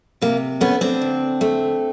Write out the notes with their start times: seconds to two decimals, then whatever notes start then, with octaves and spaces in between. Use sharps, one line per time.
0.22 C3 A#3
0.61 A3 B3 C#4
0.81 C4 D4
1.01 D2
1.41 A3